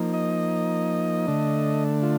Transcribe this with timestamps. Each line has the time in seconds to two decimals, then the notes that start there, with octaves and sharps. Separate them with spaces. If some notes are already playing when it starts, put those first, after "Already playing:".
Already playing: F3 A#3 D#4
0.14 D#5
1.27 D3 A3 D4
2.03 F4